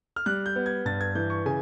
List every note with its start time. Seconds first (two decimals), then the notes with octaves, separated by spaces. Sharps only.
0.16 F6
0.26 G3 F#6
0.46 G6
0.56 B3
0.66 G#6
0.85 G2 A6
1.01 G#6
1.15 E3 G6
1.30 C#6
1.45 C#3 G#5